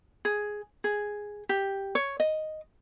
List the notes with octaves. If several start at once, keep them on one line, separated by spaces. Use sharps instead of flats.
G#4
G#4
G4
C#5
D#5